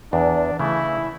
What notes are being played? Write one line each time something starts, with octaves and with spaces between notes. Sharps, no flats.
E2 D4
C#3 E3 A3 E4